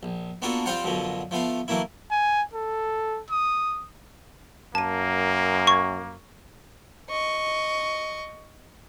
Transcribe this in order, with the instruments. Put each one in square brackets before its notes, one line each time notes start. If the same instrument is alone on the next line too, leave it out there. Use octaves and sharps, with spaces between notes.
[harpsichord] A#1
A#3 B3 D4 F4 F#4 A4
G3 C4 F4 C5 F5 F#5
F#2 B2 D3 F3 F#3
F3 A3 B3 F5
E3 F#3 A3 A#3 E4
[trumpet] G#5
A4
D#6
[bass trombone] F#2 [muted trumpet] A#3 [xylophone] A5 D#7
[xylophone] C#6 G#6
[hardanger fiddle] D#5 C#6